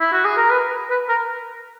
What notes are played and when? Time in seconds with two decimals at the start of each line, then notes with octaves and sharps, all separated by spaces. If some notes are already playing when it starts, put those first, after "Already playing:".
0.00 E4
0.12 F#4
0.25 G#4
0.37 A#4
0.51 B4
0.90 B4
1.09 A#4